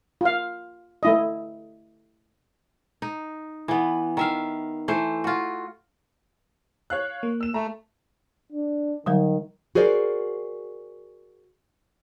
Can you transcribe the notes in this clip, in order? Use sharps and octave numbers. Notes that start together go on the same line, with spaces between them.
F4 F5
A3 E4 D#5
D#4
E3 B3
D#3 E5 F5
E3 A3 C5
F4 F#4
C#5 F5 F#6
A#3
E6 E7
A3 A#5
D4
D3 D#3 F#3 G3
F#4 G#4 A#4 C5 D5